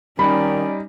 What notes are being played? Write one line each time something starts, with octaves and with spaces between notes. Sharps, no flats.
D#3 G3 C#4 D#4 D5 B5